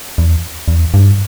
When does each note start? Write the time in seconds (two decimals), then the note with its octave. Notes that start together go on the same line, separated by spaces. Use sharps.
0.18 E2
0.68 E2
0.94 G2